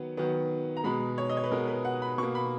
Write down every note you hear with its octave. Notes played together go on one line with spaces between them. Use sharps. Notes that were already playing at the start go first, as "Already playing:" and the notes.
Already playing: D#3 F#3 B3
D#3 F#3 B3
A#5
B2 G#3 B3 B5
C#5
D#5
C#5
B4
B2 G#3 B3 A#4
B4
F#5
B5
B2 A#3 C#6
B5